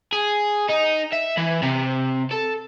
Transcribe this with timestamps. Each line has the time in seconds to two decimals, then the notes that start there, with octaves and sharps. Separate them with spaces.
0.13 G#4
0.70 D#4
1.13 E5
1.38 E3
1.63 C3
2.31 A4